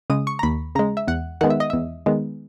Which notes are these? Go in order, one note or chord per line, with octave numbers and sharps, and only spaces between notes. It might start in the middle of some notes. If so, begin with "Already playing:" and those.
C#3 G#3 D#6
C#6
A#5
D#2 B5
C#3 G#3 A#5
E5
E2 F#5
D#3 G#3 B3 F#5
E5
D#5
E2 E5
D#3 G#3 B3